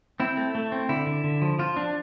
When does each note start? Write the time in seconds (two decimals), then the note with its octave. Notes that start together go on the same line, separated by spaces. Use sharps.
0.20 C4 E4
0.37 A3
0.55 A3
0.72 C4
0.89 D3 E4
1.06 D3
1.24 D3
1.42 F3
1.59 F3 F4
1.76 F3 D4